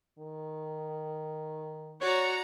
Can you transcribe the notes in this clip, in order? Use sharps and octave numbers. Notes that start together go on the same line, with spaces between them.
D#3
F#4 C#5 D5 A#5